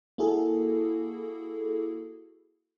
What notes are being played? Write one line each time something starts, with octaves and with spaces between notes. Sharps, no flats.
A#3 E4 F#4 G#4 A4